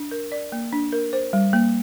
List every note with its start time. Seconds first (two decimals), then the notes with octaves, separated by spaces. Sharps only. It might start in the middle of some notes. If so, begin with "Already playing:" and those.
Already playing: D4
0.11 A#4
0.32 D5
0.52 A#3
0.73 D4
0.92 A#4
1.13 C5
1.33 G3
1.53 A#3